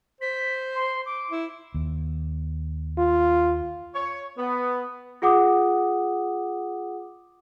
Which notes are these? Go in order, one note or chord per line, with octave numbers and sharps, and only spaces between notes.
C5 B6
C6
D6
E4
D#2
F4
C#5
B3
F4 G#4 F#5 D6 D#6